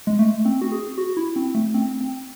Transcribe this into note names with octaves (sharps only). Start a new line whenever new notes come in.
G#3
A3
C4
F#4
G#4
F#4
E4
C4
A3
C4
C4